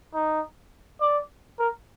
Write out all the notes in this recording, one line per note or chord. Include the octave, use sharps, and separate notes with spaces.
D#4
D5
A#4